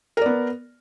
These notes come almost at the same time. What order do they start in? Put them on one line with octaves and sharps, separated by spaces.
A#4 D5 B3